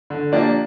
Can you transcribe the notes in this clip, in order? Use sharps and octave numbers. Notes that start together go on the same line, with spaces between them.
D3
F3 A#3 D4 G4